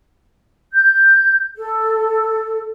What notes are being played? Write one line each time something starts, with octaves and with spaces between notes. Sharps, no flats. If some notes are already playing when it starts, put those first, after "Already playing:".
G6
A4